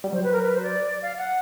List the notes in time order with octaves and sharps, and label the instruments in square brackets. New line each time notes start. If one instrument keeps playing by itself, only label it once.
[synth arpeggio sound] G3
[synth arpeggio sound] F#3 [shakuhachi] C5
[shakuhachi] B4
A#4
B4
C5
D5
F5
F#5